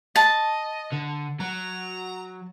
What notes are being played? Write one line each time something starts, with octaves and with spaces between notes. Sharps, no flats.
D#5 A5
D3
F#3 A#5